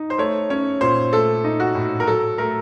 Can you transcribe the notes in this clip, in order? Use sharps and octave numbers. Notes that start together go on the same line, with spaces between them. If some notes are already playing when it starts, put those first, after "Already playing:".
Already playing: D#4
C5
A3 C#5
C#4 C#5
A#2 C5
A3 A4
D#4
F#4
A2
A#4
F#3 A4
A3 A#4